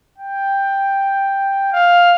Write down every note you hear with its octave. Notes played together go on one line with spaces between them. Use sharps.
G5
F5